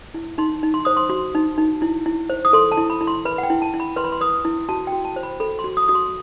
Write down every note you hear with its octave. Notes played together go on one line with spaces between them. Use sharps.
E4
D#4 C6
D#4
C6
C5 D#6
C6
F#4 C6
D#4
D#4
E4
E4
C5
D#6
A4 C6
A5
E4
B5
E4
C6
B4 B5
F#5
G5
E4
A5
E4
B5
B4 C6
B5
C6
B4 D#6
E4
F#4 A5
F#4 G5
A5
C5
B5
A4 B5
C6
F#4
D#6
F#4 D#6
C6